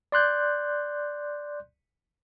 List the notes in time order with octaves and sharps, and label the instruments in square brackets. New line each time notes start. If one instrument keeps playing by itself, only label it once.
[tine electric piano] D5 C6 F#6 G6